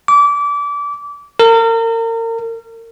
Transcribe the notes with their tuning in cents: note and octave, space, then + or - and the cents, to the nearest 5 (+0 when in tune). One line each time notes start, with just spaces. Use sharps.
D6 -25
A#4 -35